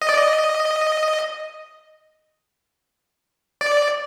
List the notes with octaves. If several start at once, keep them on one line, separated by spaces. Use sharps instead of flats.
D#5
D5
D#5
D5